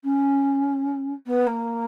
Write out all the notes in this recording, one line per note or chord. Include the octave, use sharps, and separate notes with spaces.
C#4
B3
A#3